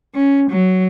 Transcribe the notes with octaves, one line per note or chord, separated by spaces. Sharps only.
C#4
F#3